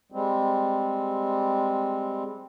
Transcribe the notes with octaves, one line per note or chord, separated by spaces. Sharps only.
G3 G#3 C4